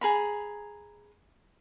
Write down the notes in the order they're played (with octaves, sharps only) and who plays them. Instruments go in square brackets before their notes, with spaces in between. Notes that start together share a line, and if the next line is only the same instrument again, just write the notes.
[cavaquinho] G#4 A#5 B5